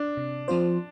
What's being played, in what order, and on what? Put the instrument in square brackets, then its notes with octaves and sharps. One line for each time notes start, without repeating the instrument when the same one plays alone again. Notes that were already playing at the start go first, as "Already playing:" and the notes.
Already playing: [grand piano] D4
[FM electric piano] C3
F3 C4 F4 C5